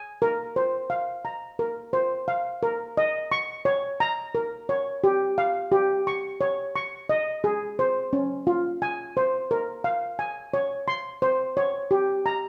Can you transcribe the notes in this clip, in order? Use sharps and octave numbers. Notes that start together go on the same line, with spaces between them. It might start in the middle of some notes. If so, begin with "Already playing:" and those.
Already playing: G#5
A#4
C5
F5
A#5
A#4
C5
F5
A#4
D#5
C#6
C#5
A#5
A#4
C#5
G4
F5
G4
C#6
C#5
C#6
D#5
G#4
C5
C#4
F4
G#5
C5
A#4
F5
G#5
C#5
C6
C5
C#5
G4
A#5